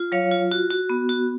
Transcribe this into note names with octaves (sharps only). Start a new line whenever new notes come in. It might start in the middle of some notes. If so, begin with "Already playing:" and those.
Already playing: F4
F#3 C#5 F5
F4
F#4
F#4
B3
F#4